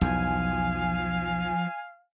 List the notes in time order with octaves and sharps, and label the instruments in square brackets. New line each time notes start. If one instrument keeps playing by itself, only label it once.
[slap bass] B1 E2 [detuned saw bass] F3 [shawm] F5 [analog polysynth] G#5